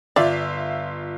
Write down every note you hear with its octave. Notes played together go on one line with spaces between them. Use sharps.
G1 F4 D5 E5